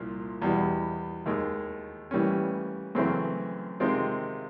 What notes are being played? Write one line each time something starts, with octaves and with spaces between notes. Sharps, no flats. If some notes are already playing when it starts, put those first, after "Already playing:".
Already playing: C2 A#2 F3
E2 B2 G3
D#2 D#3 G#3
A2 E3 G3 A#3 C#4
F#2 C#3 E3 A3 C4
C3 D#3 G#3 C4 F4